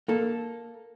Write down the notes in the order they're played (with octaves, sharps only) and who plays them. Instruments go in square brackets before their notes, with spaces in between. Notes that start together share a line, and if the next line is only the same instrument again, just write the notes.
[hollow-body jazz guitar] A#3 A4